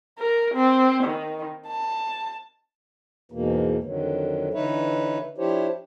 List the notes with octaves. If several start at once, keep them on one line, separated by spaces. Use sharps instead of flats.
A#4
C4
D#3
A5
E2 G#2 B2 E3 A#3
F2 D3 D#3 F#3
D3 E3 D#4 B4 C#5 E5
F3 D4 E4 G4 C5 C#5